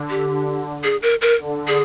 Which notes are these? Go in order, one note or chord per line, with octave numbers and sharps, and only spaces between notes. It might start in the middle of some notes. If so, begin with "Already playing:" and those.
Already playing: D3
G4
G#4
A#4
A#4
D3
G#4